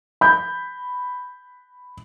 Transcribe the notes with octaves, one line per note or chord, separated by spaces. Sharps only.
B5 G6